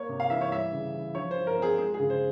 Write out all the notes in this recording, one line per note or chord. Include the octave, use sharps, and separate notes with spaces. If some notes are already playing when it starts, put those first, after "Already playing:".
Already playing: A#3 C#5
C3
F5
E3 E5
C#5
G3 E5
C#3
E3
F3 C#5
C5
F3
A#4
C4 G#4
G#3 G#4
G#4
C#3
C5